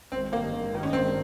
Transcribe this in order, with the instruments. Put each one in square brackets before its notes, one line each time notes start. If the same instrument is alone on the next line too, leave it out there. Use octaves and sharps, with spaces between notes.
[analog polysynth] G#1 [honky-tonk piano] C4
[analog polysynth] G2 D#3 [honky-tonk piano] A#3
[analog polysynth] G#1
G2 D#3
[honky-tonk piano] C#4
[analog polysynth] G#1 [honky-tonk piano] C4